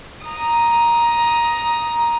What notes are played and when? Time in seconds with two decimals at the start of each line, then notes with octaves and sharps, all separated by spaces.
0.24 A#5 D#6